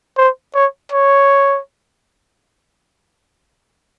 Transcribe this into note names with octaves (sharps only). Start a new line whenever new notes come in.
C5
C#5
C#5